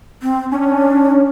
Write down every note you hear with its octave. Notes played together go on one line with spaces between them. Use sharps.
C4
C#4 D4